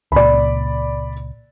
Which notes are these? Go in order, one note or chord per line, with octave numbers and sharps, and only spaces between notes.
C#2 A#2 D5 B5